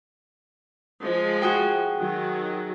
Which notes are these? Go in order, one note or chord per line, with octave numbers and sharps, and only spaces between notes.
F3 G#3
F#4 G#4 G5
D#3 F#3